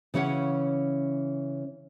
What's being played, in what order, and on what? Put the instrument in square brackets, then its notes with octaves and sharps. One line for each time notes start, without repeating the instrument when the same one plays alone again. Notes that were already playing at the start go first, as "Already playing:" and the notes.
[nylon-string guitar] C#3 E3 C#4 C#5 F#5